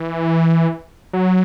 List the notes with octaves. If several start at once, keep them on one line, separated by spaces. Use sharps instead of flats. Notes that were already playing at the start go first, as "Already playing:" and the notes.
Already playing: E3
F#3